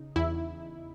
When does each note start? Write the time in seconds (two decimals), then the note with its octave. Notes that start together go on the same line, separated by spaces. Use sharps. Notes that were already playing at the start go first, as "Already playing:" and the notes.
Already playing: C#3 D#4
0.16 E2 E4